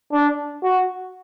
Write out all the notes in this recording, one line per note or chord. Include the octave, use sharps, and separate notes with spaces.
D4
F#4